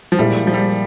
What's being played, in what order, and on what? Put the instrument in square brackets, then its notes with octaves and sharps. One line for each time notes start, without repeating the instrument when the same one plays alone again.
[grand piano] F3
[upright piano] A#2 G#3 E4 [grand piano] G3
[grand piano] F3
G3